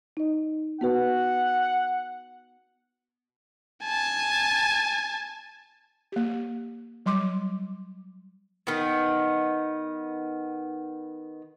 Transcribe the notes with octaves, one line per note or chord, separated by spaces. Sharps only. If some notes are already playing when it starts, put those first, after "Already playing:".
D#4 D#5
B3 F#4 B4 F#5
G#5 A5
A#3 G4
F#3 G3 C6 D6
D#3 B3